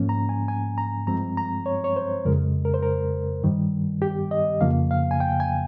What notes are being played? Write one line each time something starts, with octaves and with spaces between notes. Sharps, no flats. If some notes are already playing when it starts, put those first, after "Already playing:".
Already playing: G#2 F3 A#3 C#4
A#5
G#5
G#5
A#5
G2 F3 G#3 C4 A#5
A#5
C#5
C#5
C5
F2 C#3 G#3 A#4
A#4
C5
A#4
G2 D#3 G3
G4
D#5
F2 C#3 F3 A#3 F5
F5
G#5
G5
G#5